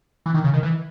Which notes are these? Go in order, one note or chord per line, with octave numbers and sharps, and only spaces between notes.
E3
D#3
C#3
D#3
E3